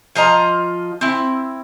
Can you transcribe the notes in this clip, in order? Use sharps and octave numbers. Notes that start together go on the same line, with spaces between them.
F3 F4 D#5 A#5
C4 E4